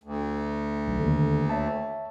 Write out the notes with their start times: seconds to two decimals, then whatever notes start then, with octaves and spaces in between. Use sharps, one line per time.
0.04 D2
0.87 B1
0.99 D#2 D3
1.50 C#5 E5 A5